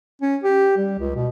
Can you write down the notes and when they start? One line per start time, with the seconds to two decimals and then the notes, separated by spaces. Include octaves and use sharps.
0.22 C#4
0.44 G4
0.77 G3
0.99 C#2
1.16 B2